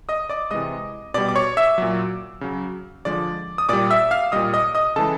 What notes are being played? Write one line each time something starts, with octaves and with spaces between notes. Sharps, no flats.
D#5 D#6
D5 D6
C3 E3 G#3 D#5 D#6
B2 G3 D5 D6
D6
C#5 C#6
E5 E6
A#2 F#3
C#3 F#3
D3 F3 G#3 D5 D6
D#6
A#2 G3 D5 D6
E5 E6
F5 F6
A#2 G3 D#5 D#6
D#5 D#6
D#5 D#6
C#3 E3 G#3 A4 A5